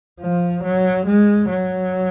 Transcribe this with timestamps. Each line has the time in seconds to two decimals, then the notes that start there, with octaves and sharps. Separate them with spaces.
0.21 F3
0.64 F#3
1.06 G#3
1.49 F#3